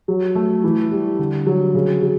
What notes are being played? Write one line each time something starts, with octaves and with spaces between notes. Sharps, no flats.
F#3
A3
E3
G3
D3
F#3
C#3
F#3